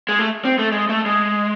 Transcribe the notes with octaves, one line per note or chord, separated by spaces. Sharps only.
G#3
A3
C4
A3
G#3
A3
G#3